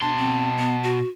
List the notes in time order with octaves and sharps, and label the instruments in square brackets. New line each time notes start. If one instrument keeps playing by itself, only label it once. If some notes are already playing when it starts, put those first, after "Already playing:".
[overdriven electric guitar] B2 C6 [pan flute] D4 [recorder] A5
[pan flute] C4
B3
F#4